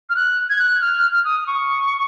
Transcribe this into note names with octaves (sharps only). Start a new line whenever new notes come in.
F6
F#6
G#6
F#6
F6
F6
D#6
C#6